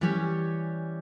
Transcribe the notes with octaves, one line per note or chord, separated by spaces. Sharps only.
E3 G3 C#4 G4 C#5